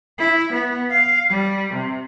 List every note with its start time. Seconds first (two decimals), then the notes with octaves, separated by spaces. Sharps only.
0.19 E4
0.53 B3
0.90 F5
1.30 G3
1.74 C3